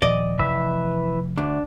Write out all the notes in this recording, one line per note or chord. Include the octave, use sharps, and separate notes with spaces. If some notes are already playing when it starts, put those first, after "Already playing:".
D#1 F3 D5 D#5
F1 E3 B4 E5
D2 D4